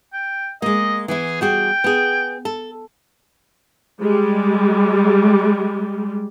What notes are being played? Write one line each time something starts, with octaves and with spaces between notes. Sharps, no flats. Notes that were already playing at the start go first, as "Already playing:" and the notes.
G5
G#3 A#3 D#5
E3 B3 E4 G#4
G3 F#4 G#4 G5
B3 G#4
A4
G3 G#3